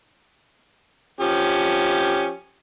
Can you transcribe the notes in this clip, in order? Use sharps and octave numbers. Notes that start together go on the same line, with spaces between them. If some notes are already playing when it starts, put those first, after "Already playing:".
F3 C#4 G4